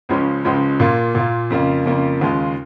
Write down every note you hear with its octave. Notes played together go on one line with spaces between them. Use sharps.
C#2 C#3 F3 G#3 C#4
C#2 C#3 F3 G#3 C#4
A#2 A#3 F4
A#2 A#3 F4
F2 C#3 A#3 F4
F2 C#3 A#3 F4
D#2 C#3 G#3 F4